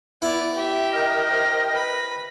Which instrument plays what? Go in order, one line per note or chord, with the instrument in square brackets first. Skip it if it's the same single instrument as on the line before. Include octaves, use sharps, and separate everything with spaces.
[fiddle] B3 D5 [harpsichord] E4
[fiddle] G4 E5
[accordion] A#4 D#5 G5 [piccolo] A#6
[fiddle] G4 C5
B4 B5